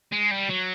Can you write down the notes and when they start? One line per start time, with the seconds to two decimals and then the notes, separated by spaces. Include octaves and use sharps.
0.12 G#3
0.31 G3
0.49 F#3